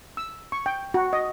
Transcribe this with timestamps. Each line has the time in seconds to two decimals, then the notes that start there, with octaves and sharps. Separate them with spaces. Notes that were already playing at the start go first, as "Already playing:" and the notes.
0.17 E6
0.52 C#6
0.66 G5
0.94 F#4
1.13 D#5